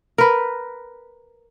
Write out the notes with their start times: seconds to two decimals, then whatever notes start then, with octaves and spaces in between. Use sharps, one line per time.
0.18 A#4 B4